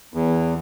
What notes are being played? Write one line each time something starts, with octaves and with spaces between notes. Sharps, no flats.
E2